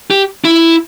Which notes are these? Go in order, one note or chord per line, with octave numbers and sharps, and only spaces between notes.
G4
E4